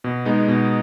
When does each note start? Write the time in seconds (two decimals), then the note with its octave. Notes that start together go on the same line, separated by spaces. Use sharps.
0.04 B2
0.25 G#3 B3 D#4
0.48 B2